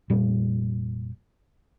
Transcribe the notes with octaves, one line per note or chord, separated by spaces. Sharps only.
F1 A#2 G3